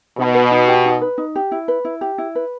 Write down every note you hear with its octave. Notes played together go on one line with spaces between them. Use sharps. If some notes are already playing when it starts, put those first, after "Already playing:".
B2 D#4
B4
D#4
G4
D#4
B4
D#4
G4
E4
B4
E4
G4
E4
B4